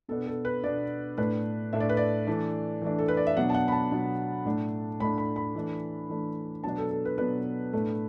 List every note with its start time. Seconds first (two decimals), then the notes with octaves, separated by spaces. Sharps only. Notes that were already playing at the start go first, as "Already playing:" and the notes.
0.08 B2 B3 D4 A4
0.27 A4
0.45 B4
0.63 B2 B3 D4 D5
1.18 A2 A3 D4 B4
1.73 A2 A3 D4 E5
1.80 D5
1.89 B4
1.97 D5
2.27 E3 A3 D4
2.82 E3 A3 D4
2.99 A4
3.08 B4
3.17 D5
3.27 E5
3.37 B2 F#3 B3 D4 F#5
3.50 A5
3.54 F#5
3.68 B5
3.72 A5
3.92 B2 F#3 B3 D4
4.45 A2 A3 D4
5.00 A2 A3 D4 B5
5.18 B5
5.36 B5
5.55 E3 A3 D4
6.10 E3 A3 D4
6.64 B2 F#3 B3 D4 A5
6.78 A4
6.91 A4
7.05 B4
7.18 B2 F#3 B3 D4 B4
7.73 A2 A3 D4